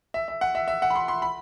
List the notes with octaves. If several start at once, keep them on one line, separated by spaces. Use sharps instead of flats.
E5
E5
F#5
E5
E5
F#5
B5
C6
C6
B5